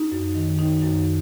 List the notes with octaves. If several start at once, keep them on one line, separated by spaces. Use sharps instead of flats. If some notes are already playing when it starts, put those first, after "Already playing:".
Already playing: D#4
F#2
D#3
D#4
F#2